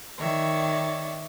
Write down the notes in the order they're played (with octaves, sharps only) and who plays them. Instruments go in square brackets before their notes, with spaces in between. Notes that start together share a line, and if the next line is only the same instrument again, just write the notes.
[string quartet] D#3 C#5 D5 E5